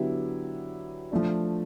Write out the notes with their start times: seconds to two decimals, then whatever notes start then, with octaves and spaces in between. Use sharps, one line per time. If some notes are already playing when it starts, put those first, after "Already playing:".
Already playing: D3 F#3 B3 E4 G4
1.12 F3 A3 D4